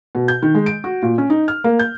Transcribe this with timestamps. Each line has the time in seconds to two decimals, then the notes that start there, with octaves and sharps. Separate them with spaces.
0.15 B2
0.28 G6
0.42 D#3
0.55 G#3
0.66 D7
0.84 F#4
1.02 A#2
1.18 C#4
1.30 D#4
1.48 F6
1.64 A#3
1.79 G6